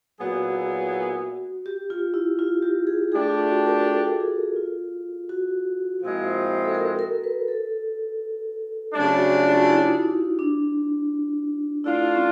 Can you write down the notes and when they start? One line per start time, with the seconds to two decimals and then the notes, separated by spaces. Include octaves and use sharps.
0.20 A#2 F#3 B3 E4 F#4 G#4
1.66 G4
1.90 F4
2.14 E4
2.39 F4
2.62 G4
2.87 G#4
3.11 A3 D4 G4 G#4
3.30 F4
3.47 F#4
3.66 A#4
3.84 A4
4.20 G#4
4.56 F4
5.29 F#4
6.02 A#2 F3 G#3 C4 E4
6.65 A4
6.75 A#4
6.99 A#4
7.24 B4
7.48 A4
8.93 C#3 F#3 A3 D4 G4
9.17 F#4
9.42 F4
9.65 E4
9.90 D#4
10.39 D4
11.84 A3 D4 E4 F4
12.16 C#4